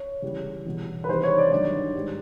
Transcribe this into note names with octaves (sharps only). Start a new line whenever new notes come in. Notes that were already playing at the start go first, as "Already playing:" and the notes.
Already playing: C#5
E2 C#3 E3 G3
E2 B2 G3
B4
E2 C3 D#3 G3 C5
C#5
D5
G2 D#3 F#3 D5
G#2 D#3 G3